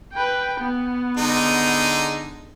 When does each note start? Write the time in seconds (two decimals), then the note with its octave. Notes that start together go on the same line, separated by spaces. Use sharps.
0.13 B4 G5
0.60 B3
1.17 D3 G#3 D#4